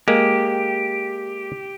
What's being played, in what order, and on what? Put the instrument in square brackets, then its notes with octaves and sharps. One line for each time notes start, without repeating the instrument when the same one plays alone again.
[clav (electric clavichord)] G#3 A#3 [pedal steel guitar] G4